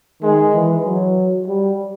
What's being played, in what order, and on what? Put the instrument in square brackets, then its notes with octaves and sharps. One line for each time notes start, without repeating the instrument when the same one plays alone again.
[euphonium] D#3 [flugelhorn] G#3
[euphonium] E3
F#3
G3